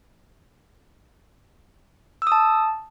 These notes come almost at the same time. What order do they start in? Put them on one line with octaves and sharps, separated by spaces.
E6 D#6 A5